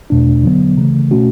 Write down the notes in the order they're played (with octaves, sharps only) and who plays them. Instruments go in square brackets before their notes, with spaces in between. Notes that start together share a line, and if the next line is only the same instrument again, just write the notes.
[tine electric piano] E2 B2 A3 D4
D3 F#3 B3
C#3 E3 A3
B2 A3 C#4 F#4